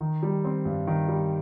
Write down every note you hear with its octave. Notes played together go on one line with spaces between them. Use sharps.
D#3
G3
C4
G2
D#3
G3